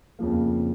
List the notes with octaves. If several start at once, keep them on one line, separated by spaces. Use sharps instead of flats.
F2 C#3 F3 A#3